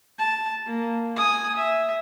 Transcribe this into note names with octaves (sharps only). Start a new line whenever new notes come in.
A5
A#3
G#5 D#6
E5